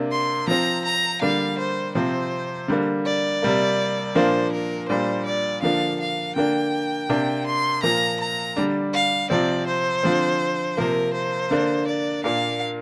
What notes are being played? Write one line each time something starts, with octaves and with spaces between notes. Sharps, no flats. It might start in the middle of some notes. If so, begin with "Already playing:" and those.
Already playing: C3 A#3 D4
C6
F3 C4 A#5
A#5
D3 G3 A#3 D4 F5
C5
C3 F3 C4 C5
D3 G3 A#3
D5
C3 G3 A#3
A#2 F3 A#3 D4 C5
A#4
A#2 G3 D4 C5
D5
D3 F3 A#3 D4 F5
F5
D3 A#3 D4 G5
C3 A#3 D4
C6
A#2 F3 A#3 A#5
A#5
D3 G3 D4
F5
C3 F3 C4 D5
C5
D3 F3 C4
C3 F3 A#3 A#4
C5
D3 A#3 D4
D5
A#2 A#3 D4 F5